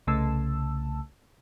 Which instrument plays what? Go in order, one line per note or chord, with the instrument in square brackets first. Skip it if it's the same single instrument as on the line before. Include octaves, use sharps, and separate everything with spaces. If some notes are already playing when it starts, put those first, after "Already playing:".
[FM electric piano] C2 C#3 A3 A5 E6